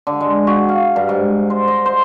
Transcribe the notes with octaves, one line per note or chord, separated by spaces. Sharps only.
D3
G#3
F#4
F5
G2
G#2
C5
D#5
C5